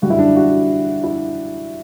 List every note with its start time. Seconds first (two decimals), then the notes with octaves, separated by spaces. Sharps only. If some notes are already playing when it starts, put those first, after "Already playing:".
0.02 F#2 D3 G3 F#4
0.10 E4
0.19 D4
0.36 F#4
1.03 E4